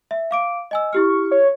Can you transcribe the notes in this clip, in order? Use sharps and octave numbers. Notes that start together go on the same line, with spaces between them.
E5
F5 D6 D7
D#5 G#5 E6
E4 G4 C#6 F6
C#5